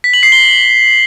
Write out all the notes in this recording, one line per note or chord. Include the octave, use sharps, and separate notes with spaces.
B6
F#7
C7
G7